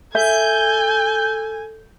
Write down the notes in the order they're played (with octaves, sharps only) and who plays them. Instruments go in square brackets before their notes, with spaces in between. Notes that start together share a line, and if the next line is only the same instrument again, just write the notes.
[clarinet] A4 [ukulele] E5 [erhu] G#5 [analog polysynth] G6